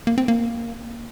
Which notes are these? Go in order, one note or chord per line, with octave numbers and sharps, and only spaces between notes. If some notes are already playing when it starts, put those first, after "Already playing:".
A#3
C4
A#3